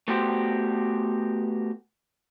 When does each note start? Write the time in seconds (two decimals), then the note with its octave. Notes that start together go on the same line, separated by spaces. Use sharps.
0.08 A3 B3 F#4 G4 C5